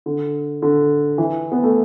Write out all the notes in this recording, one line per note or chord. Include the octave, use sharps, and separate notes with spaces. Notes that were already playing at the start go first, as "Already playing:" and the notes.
D3
D3
E3
B3
A3